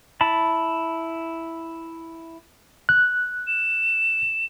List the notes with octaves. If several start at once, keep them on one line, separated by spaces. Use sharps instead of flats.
E4 A5 B5
F#6
E7